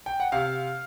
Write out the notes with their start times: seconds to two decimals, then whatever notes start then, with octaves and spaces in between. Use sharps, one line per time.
0.06 G5
0.20 F#5
0.32 C3 F5